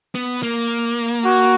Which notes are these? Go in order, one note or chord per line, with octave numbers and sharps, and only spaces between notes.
B3
A#3
F#4